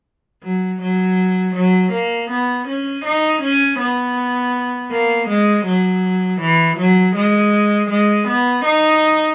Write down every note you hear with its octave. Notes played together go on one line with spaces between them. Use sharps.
F#3
F#3
F#3
A#3
B3
C#4
D#4
C#4
B3
A#3
G#3
F#3
E3
F#3
G#3
G#3
B3
D#4